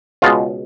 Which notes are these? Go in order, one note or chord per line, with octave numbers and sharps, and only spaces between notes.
C#2 B2 G#3 F4